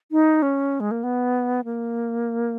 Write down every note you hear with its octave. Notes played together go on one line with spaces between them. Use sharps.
D#4
C#4
G#3
A#3
B3
A#3